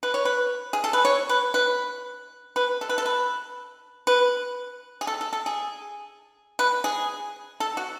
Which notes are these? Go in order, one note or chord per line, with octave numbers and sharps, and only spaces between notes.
B4
C#5
B4
G#4
A4
B4
C#5
B4
B4
B4
A4
B4
A4
B4
B4
G#4
A4
A4
A4
G#4
B4
G#4
A4
F#4